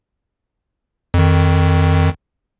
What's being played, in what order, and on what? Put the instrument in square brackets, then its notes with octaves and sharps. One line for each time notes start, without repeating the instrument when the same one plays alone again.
[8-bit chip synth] F2 D#3